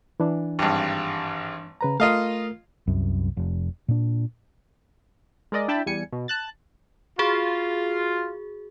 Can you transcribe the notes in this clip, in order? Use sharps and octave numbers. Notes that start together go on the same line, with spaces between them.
E3 D4
G#1 G2
C#3 B4 A#5
A3 F4 A#4 D#5 F5
C2 F#2
F1
A#2 D4
G#3 A#4 D5 D#5
D4 E4 G5 A5 B5
E2 G3 G#5 C#7
B2
A5 F#6 A6
F4 F#4 G#4